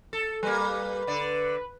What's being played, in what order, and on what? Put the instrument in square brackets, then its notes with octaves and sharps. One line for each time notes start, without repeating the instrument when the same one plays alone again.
[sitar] A4
[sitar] G3 A#3 [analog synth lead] B4
[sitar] D3 D5